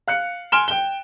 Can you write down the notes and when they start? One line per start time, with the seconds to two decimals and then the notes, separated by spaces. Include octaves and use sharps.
0.08 F5 F#6 C#7
0.52 G#5 C6 F6 D7 E7 G7
0.68 G5 G7